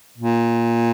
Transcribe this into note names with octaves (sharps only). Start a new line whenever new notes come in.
A#2